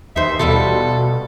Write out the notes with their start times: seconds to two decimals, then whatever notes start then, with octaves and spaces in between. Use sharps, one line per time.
0.16 D#2 D#4 C5 E5
0.39 B2 G3 E4 F4 A4